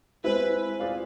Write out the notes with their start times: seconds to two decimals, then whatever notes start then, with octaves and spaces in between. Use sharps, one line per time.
0.24 G#3 C4 E4 B4
0.80 C4 F4 G#4 D5 F5